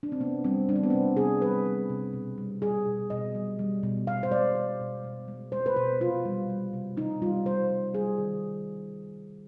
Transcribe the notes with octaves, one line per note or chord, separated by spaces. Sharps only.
D4
C4
C3 B3
G3 C4
G3 D4
C4
B3
C3 C4
C3 G#4
G3 B4
G3
C3
B2
G3
G3 G#4
B2
B2 D#5
G3
G3
B2
B2 F5
C5
G#3 D5
G#3
B2
B2
G#3
G#3 C5
B4
B2 C5
C3 F4
G3
G3
C3
C3 D#4
G3 F4
G3 C5
C3
G3 G#4
D#3